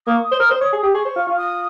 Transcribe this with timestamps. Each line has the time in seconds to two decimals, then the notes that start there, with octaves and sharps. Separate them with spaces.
0.06 A#3 D#6
0.15 C#6
0.22 D#6
0.32 C5
0.39 A#4
0.50 C5
0.61 C#5
0.72 G#4
0.83 G4
0.93 G#4 C#6
1.05 C5
1.16 F4
1.27 F4
1.38 D#6